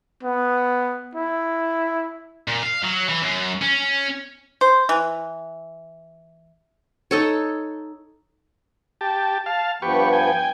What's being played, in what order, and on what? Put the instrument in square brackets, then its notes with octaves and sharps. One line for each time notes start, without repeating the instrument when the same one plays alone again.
[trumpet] B3
E4
[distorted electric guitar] A#2
F5
F#3
E3
F#2
C#4
[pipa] C5
E3
[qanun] D#4 A4 C#5
[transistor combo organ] G4 A5
F5 A5
[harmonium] G2 F3 B3 [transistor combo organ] G4 B4 C#6
[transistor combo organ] G5 G#5